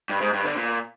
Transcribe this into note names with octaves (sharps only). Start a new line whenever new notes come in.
G2
G#2
G2
D3
A#2